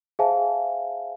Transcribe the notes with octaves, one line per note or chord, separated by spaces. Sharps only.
G#4 C5 E5 F5 G#5 A5